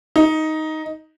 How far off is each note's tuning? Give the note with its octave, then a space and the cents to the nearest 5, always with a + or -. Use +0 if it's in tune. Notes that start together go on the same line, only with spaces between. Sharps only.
D#4 +10